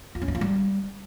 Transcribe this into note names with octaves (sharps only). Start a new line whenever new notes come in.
F4
C#4
E4
F4
G3